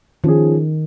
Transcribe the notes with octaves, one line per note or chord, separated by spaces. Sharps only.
D#3 F3 C#4 G#4